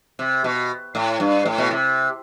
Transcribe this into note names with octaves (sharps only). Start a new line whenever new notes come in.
C3
B2
A2
G2
A2
B2
C3